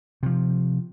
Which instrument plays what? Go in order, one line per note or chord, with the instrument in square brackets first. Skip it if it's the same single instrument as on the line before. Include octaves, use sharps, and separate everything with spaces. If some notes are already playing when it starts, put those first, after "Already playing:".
[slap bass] C3 F3